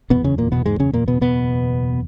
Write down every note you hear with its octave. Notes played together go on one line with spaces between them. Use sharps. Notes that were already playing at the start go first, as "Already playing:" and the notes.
F#1 E2 B2 B3
C#3 C#4
A#2 A#3
B2 B3
G#2 G#3
C#3 C#4
A#2 A#3
B2 B3
B2 B3